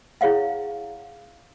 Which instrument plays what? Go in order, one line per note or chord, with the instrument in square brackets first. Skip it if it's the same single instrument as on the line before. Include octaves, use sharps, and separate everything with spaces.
[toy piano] E4 G#4 C#5 F5 F#5